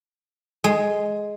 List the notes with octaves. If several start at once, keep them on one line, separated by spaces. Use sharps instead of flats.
G#3